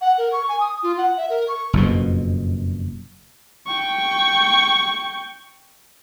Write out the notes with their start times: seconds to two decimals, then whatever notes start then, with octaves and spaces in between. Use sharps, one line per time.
0.01 F#5
0.18 A#4
0.32 C#6
0.49 G#5
0.60 D#6
0.83 F4
0.98 F#5
1.17 E5
1.30 A#4
1.48 C#6
1.73 F#1 F2 B2
3.67 G5 C#6